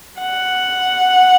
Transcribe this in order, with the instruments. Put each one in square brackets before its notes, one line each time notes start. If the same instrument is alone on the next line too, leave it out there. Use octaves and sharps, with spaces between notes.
[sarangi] F#5